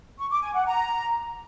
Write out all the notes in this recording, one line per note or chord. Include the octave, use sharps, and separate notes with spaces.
C#6
D6
G#5
F#5
A#5